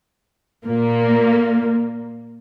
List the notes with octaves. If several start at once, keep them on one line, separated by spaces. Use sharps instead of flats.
A#2 A#3